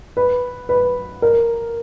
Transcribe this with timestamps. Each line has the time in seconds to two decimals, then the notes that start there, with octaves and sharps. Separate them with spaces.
0.17 B4
0.69 B4
1.22 A#4